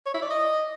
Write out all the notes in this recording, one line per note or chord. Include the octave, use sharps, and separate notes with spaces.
C#5
E4
D5
D#5